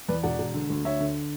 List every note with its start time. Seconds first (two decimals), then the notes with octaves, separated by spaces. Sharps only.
0.08 E2 B4 D5
0.23 E1 D5 F#5
0.39 E1
0.54 D3
0.70 D2
0.85 D3 C#5 E5
1.00 D3